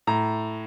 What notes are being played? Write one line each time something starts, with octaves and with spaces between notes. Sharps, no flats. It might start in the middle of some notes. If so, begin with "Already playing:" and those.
A2 A#5